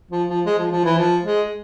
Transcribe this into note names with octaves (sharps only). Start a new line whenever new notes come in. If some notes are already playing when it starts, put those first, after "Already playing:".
F3
F3
G#3
F3
F3
E3
F3
G#3